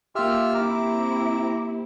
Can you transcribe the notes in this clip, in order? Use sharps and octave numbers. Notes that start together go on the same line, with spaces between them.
A#3 F4 G4 E5 F6
C4 E4 A#5 D6